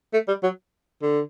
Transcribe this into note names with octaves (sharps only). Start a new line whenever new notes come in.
A3
G3
F#3
D3